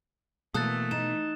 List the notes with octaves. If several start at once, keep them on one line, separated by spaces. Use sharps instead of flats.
B2 E3 A3 A#3 A4 D#6 F#6 A6
D#4 A6 E7